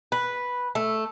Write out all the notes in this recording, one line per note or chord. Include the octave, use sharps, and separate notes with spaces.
B4
A3